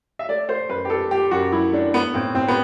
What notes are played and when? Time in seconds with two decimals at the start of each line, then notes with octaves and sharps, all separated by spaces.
0.19 E5
0.28 A3 D5
0.49 A3 C5
0.69 F#2 B4
0.85 G4
0.90 A3 A4
1.11 A3 G4
1.31 F#2 F#4
1.52 F#3 E4
1.73 A3 D4
1.93 A3 B3
2.14 A2 C4
2.35 A2 C4
2.48 B3